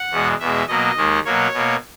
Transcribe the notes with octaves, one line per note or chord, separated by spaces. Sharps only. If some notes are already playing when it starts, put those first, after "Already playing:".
Already playing: F#5
E2 B2 G#3
E2 B2 G#3 E5
B2 F#3 A#3 D#5
D#2 D#3 G#3
B2 F#3 A#3 C#5
B2 A#3